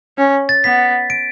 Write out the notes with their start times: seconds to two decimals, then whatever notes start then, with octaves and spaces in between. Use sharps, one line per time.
0.18 C#4
0.49 A6
0.64 B3 B6
1.10 D7